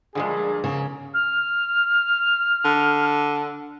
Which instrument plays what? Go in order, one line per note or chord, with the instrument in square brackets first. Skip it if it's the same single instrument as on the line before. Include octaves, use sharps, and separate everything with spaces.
[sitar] G2 A#2 [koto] D3 F3 G#3 [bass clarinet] G#4
[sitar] G#2 A#3 [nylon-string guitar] C#3
[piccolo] F6
[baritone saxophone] D3